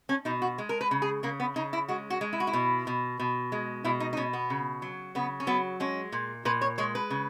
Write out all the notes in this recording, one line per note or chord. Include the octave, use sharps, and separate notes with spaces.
C#4
B2 D#4
F#4
G#3
A#4
B4
C#3
G#4
C#3 A#3
B3
C#3 D#4
E4
G#3 F#4
F#4
G#3
E4
F#4
E4
B2
B2
B2
G#3
B2 E4
D#4
D#4
B2 C#4
B3
C#3
F#3
C#3 B3
C#4
F#3 B3
G#3 C#4
A#2
A#2 B4
C#5
G#3 C#5
B4
C#3